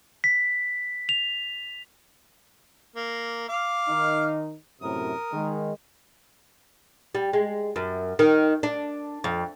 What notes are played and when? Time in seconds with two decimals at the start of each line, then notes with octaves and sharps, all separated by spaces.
0.24 B6
1.09 F7
2.96 A#3
3.49 F5 D6 F6
3.89 D#3 D#4
4.82 F#2 A2 C3 A#4 D#6
5.33 D#3 G#3
7.15 G3
7.33 G#3
7.76 F#2
8.19 D#3
8.63 D4
9.24 F2